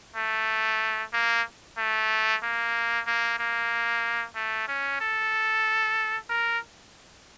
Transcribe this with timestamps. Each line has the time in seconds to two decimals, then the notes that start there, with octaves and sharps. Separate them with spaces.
0.16 A3
1.13 A#3
1.78 A3
2.43 A#3
3.07 A#3
3.39 A#3
4.35 A3
4.68 C#4
5.01 A4
6.30 A#4